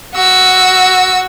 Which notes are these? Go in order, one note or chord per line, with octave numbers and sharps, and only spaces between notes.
F#4 E6